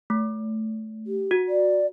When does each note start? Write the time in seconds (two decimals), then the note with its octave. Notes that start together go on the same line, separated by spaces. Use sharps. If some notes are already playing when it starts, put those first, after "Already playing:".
0.10 A3
1.07 G4
1.31 F#4
1.48 D5